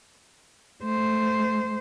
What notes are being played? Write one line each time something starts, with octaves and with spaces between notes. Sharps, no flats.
A3 C5